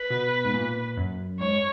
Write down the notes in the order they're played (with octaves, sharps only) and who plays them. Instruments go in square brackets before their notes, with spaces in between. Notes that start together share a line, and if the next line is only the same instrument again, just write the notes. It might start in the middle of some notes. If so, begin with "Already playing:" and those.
Already playing: [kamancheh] B4
[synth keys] B2
G#2
A#2
F#2
[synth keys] G#2 [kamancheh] C#5